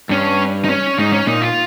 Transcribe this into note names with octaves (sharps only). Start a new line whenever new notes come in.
G2 C#4
D#4
C#4
G#2 D#4
C#4
A#2 D#4
F4